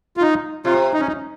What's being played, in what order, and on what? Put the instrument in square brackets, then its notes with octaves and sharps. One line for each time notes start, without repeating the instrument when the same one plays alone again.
[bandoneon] F4
D#4
[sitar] C3 [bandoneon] F4
[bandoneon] D#4
C#4
D#4